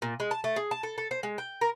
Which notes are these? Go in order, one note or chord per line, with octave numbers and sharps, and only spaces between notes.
A#2
G#3
A5
A3
G#4
A5
A4
A4
C5
G#3
G5
A#4